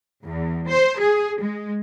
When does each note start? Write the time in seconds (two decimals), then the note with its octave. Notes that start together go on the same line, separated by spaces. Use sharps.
0.24 E2
0.67 C5
0.98 G#4
1.40 G#3